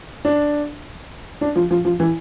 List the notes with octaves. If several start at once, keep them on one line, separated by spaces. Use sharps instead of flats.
D4
D4
F3
F3
F3
E3